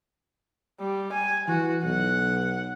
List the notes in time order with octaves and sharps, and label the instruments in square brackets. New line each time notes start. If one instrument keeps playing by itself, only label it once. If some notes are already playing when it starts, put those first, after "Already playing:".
[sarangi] G3
G#5
[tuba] E3 [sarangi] F#4
[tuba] B1 [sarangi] F#5